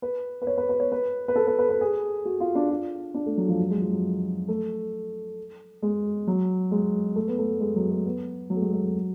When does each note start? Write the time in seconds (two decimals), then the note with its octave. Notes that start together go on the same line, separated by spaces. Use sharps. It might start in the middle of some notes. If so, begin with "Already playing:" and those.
0.02 B4
0.42 B4
0.47 C#5
0.58 B4
0.69 B4
0.80 C#5
0.92 B4
1.28 B4
1.36 A4
1.47 B4
1.59 B4
1.69 B4
1.81 G#4
2.25 F#4
2.40 F4
2.55 D4
2.69 F4
3.14 D4
3.26 A3
3.38 F#3
3.48 F3
3.59 F#3
3.70 G#3
3.82 F3
3.93 F#3
4.48 A3
5.82 G#3
6.27 F#3
6.71 G#3
7.16 A3
7.28 B3
7.39 A3
7.61 G#3
7.76 F#3
7.90 A3
8.05 B3
8.50 F#3
8.56 A3
8.61 G#3
8.73 G#3
8.83 F#3